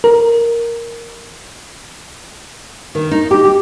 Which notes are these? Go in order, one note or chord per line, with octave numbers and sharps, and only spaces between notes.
A#4
D#3
D#4
G4
G4